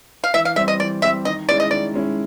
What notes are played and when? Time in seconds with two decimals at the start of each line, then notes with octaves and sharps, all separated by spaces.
0.24 F5
0.34 E3 E5
0.45 F5
0.56 G3 C4 E5
0.68 D#5
0.80 E3 D5
1.02 G3 C4 E5
1.25 D#3 D#5
1.49 G#3 C#4 E4 D5
1.60 D#5
1.71 D#3 D5
1.94 G#3 C#4 E4